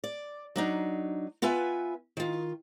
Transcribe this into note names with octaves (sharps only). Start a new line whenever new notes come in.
D5
F#3 D4 D#4
B3 F4 B4 E5 G#5
D#3 F4